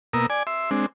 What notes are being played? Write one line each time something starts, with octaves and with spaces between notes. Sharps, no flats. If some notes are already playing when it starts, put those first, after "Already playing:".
B2 A#3 A#4 D#6 E6
D5 G#5
E5 C6
G#3 C4 D4